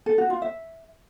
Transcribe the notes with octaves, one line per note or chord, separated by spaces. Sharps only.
A4
F#4
F4
E5